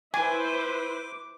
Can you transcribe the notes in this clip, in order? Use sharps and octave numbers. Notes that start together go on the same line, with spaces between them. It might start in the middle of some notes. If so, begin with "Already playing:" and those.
E4 B4 C5 G#5 D6